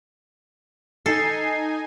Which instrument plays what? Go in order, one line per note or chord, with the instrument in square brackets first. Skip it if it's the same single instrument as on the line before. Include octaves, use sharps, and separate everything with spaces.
[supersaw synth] D#4 G#5 [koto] A4 [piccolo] C7